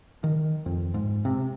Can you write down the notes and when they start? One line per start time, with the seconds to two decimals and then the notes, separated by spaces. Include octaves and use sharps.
0.24 D#3
0.66 F2
0.94 G#2
1.25 C3